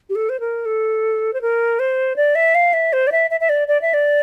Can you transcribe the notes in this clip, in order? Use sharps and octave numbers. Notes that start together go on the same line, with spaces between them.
G4
A4
C5
A#4
A4
C5
A#4
C5
D5
E5
F5
E5
C5
D5
E5
E5
E5
D5
D5
E5
D5